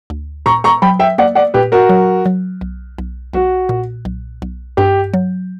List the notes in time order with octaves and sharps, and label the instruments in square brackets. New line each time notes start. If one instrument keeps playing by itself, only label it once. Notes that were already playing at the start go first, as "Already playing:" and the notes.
[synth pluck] D2
[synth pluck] A#2 [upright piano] A#5 C#6
[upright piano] A#5 C#6
[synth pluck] F#3 [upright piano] G5 B5
[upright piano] E5 G5
[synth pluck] A#3 [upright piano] D5 F#5
[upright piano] D5 F#5
[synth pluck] A#2 [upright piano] G4 B4
[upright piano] F#4 A#4
[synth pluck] F#3
F#3
B1
B1
[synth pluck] B1 [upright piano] F#4
[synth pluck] A#2
B1
B1
[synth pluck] G2 [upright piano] G4
[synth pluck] F#3